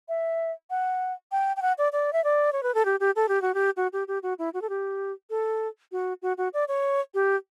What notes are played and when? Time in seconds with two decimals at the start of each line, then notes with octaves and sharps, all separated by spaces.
0.09 E5
0.70 F#5
1.32 G5
1.57 G5
1.62 F#5
1.78 D5
1.93 D5
2.13 E5
2.24 D5
2.52 C#5
2.63 B4
2.74 A4
2.85 G4
3.00 G4
3.16 A4
3.29 G4
3.42 F#4
3.54 G4
3.77 F#4
3.93 G4
4.08 G4
4.23 F#4
4.39 E4
4.54 F#4
4.62 A4
4.69 G4
5.30 A4
5.92 F#4
6.22 F#4
6.38 F#4
6.54 D5
6.68 C#5
7.14 G4